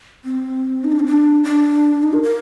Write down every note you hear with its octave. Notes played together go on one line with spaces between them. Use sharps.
C4
D#4
D4
C4
D4
D4
D#4
A#4
A#4